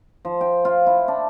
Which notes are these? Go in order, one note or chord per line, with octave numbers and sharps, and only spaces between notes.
F3
G5
F4
E4
D4